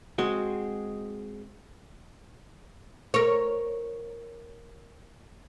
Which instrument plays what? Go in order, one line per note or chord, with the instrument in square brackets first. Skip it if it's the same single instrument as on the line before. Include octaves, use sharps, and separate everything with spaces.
[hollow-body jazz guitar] G#3 C4 F#4
[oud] A#4 C#5